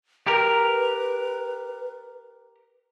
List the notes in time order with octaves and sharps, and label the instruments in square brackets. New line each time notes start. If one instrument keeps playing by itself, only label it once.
[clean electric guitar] G4 A#4 [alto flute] B4